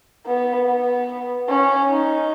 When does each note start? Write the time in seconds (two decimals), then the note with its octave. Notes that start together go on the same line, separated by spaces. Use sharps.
0.26 B3
0.67 B3
1.49 C#4
1.90 D#4